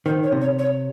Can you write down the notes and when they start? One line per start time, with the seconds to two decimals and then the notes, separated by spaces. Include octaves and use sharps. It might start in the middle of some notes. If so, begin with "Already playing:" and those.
0.05 D#3 C5
0.23 C#5
0.32 C3
0.41 C#5
0.59 C#5